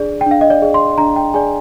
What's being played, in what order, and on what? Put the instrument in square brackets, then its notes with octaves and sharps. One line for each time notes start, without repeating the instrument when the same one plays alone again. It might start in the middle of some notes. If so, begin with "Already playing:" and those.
Already playing: [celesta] D4 G#4 D5
G5
D4 F5
D#5
D5
G#4 D5
C6
D4 A#5
G5
G#4 D5 G#5